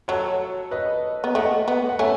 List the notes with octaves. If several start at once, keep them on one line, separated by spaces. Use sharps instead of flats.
F#3 A4 C#5
B4 D#5
B3
A3 D#5 F#5
B3
F#5
A3 C#4 E5 G#5